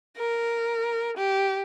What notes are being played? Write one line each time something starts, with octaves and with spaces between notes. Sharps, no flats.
A#4
G4